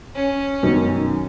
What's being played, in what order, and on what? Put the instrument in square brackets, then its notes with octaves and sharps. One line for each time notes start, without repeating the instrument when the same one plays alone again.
[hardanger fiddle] C#4
[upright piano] F#2 B2 D#3